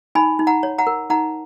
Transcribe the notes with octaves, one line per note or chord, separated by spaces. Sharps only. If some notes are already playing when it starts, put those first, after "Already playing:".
D#4 G#5 B5
D#4
F#5 A#5
C#5
F#5 A#5
A#4
D#4 F#5 A#5